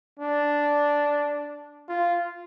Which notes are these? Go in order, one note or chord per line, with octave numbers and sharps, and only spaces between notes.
D4
F4